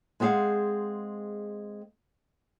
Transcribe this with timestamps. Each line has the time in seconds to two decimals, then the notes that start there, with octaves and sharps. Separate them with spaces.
0.20 G#3 B3 C4 G#4 F5 F#5